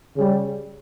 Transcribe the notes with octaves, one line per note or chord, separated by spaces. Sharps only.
C#3 G3